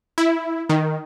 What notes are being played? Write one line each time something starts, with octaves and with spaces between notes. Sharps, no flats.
E4
D#3